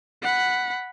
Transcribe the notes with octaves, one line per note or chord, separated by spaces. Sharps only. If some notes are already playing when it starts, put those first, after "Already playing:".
F#5 B5